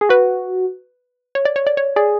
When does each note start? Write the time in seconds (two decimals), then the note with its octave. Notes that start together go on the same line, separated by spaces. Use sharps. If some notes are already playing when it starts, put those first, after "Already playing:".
0.01 G#4
0.09 F#4 B4
1.35 C#5
1.45 D5
1.56 C#5
1.67 D5
1.77 C#5
1.96 G#4 D5